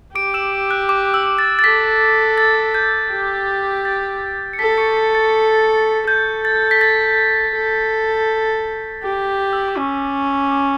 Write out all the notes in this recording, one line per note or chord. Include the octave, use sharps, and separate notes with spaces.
G4 D6 D7
E6 E7
F#6
D6
E6
A6
A6
A4 B6
A6
G6
G4
A6
C#7
A4 B6
C#6 C#7
B6
A6
A4 G6
A6
B6
A6
A4
G4
E6
D6
C#4 C#6
D6